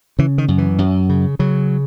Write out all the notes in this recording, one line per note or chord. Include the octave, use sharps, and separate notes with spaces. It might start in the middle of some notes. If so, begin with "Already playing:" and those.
C#3 E3
D#3
F#2
E3
F#2
C#3
C#3 F#3